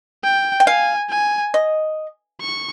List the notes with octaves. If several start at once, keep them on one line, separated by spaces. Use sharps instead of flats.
G5
G5
F5 G#5
G#5
D#5
C#6